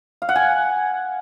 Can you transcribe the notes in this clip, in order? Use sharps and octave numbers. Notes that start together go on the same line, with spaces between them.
F5
F#5
G#5